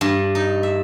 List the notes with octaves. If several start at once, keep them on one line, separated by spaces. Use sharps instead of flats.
G2
D#4
E5